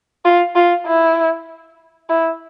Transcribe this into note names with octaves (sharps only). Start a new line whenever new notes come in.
F4
F4
E4
E4